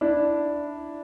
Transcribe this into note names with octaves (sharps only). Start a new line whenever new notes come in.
D4 E4